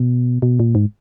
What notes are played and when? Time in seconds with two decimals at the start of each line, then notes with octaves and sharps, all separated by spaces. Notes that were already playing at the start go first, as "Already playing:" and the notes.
Already playing: B2
0.42 B2
0.60 A#2
0.75 G#2